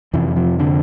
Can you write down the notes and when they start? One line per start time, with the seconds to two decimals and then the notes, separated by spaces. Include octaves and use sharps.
0.13 F2 C3 E3
0.36 F3
0.59 D3